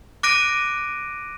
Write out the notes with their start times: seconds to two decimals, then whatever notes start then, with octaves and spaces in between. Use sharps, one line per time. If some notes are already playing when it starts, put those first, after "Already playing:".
0.23 D6 F#6 A#6 D7 D#7